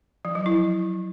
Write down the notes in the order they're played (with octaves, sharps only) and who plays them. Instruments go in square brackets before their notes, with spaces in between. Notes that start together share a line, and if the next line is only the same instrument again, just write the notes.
[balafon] F3
F#3
E4